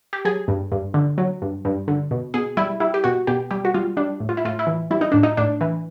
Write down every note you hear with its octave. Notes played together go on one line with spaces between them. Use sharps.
G4
F#3 G#4
G2
G2
D3
F#3
G2
G2
D3
B2
B2 G#4
G3 E4
G3 E4
G4
B2 F#4
B2 G4
G3 G4
F#4
G3 F4
G3 D4
A2
F4
E4
A2 F4
E4
E3
G3 E4
D#4
A2 D4
D#4
A2 D4
E3